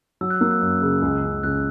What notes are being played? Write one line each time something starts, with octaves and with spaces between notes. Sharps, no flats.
F#3 E6
F#6
A#3 E6
F#6
F#2
C#3
C#2
C#3
C#2 F#6